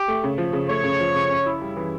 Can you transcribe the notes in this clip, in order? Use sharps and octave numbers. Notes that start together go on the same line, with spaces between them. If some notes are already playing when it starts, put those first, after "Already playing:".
Already playing: G4
A3
C#3
F3
C#3
A3 C#5
C#3
F3
C#3
C#4
E4
G3
E3